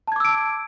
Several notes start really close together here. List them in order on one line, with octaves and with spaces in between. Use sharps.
A5 G#6 D6 E6 D7